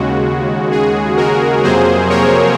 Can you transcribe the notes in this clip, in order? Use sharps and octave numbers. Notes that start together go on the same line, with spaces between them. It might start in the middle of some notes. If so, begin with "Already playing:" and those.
Already playing: D#2 C#3 G#3 F#4
G#4
F#4 A#4
F2 C3 F#3 A#3 G#4 C5
A#4 C#5